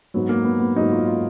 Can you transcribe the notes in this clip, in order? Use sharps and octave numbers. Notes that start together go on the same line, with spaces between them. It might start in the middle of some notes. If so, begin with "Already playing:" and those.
G#2 F#3 B3
A#3
B3
B3
G#2 F#3 D#4
F4
F4